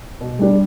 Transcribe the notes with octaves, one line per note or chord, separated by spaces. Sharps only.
B2
G3 D4 G4